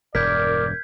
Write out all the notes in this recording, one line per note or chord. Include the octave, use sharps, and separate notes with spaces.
E1 G2 A#4 D5 G6 G#6 B6